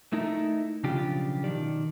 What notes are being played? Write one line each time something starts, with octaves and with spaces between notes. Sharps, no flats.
A3 D#4 E4 A#4
B1 C#3 F3 D4 F4 G4
B2 D#3 D5